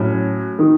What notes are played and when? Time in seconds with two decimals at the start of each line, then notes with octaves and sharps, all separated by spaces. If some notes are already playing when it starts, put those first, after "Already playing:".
Already playing: A2 F#3 C#4
0.59 D#3